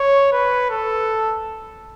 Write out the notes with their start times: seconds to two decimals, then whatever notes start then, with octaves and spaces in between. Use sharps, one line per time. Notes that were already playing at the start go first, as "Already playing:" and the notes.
Already playing: C#5
0.32 B4
0.70 A4